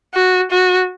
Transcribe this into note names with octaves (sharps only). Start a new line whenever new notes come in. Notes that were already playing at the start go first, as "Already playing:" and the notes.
F#4
F#4